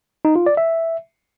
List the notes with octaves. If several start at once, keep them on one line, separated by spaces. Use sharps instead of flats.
D#4
F4
D5
E5